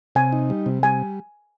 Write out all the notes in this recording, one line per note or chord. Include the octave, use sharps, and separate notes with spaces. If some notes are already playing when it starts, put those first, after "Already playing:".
C3 G#5
D#4
G3
C3
G3 G#5